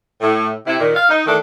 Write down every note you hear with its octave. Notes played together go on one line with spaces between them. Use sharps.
A2
C3 E4
A#2 D#3
F5
D#4
D#3 E3 A3 D4